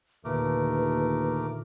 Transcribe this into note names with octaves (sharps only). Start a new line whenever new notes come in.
D#2 A#2 D3 A3 A#4 B4 D6